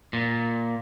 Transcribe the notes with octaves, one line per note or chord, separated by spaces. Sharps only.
A#2